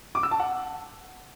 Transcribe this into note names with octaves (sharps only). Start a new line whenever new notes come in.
D6
E6
A5
F#5